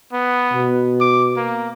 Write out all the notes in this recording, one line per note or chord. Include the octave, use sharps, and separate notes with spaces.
B3
B2
D6
A#3